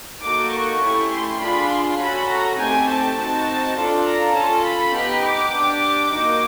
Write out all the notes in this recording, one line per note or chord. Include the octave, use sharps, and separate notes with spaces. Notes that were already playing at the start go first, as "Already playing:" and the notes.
A#3 D#4 F#4 A4 D6
C#6
A3 C#4 E4 G4
C6
D4 F4 G#4 B5
C6
C#4 F#4 A4 B5
A#5
A3 C4 D#4 G4 G#5
A5
C4 D#4 F#4
D4 F4 A4
A#5
C#4 F4 A4 A5
B5
B3 D#4 G4
D6
D4 G4
A#3 D#4 F#4 D6